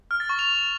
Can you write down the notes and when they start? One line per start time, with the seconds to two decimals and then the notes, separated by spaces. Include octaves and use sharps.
0.11 F6
0.20 A6
0.29 C#6
0.39 F7